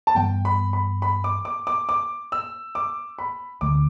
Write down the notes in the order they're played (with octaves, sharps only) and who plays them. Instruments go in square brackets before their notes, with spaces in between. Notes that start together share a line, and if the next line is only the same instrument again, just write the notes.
[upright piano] A5
[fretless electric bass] G2 E3 G3 B3 [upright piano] G5
[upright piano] B5
B5
B5
D6
D6
D6
D6
E6
D6
B5
[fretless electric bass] D2 D3 A3 [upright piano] D6